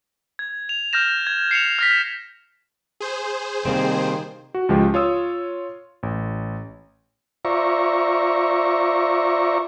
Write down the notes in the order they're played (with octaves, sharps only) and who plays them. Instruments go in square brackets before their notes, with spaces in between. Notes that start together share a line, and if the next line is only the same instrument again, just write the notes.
[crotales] G#6
F7
F6 G6 A#6 E7
G#6
C7 C#7 E7 F7
F6 A#6 B6
[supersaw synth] G#4 C5
[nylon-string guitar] C3 G3 A#3 [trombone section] D#3 [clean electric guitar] C4
[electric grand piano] F#4
C#2 F3 G#3 G4
F4 C#5 D#6 E6
A1
[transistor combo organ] F4 C5 D5 E5 A#5 C#6